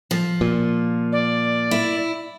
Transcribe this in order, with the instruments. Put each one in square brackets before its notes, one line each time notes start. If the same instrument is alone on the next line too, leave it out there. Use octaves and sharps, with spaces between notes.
[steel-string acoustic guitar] F3
[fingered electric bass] A#2
[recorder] D5
[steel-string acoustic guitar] E4